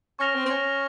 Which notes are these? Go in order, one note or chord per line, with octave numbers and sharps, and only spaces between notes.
C#4 C#6 F6 A#6 F7
C4
C4
C#4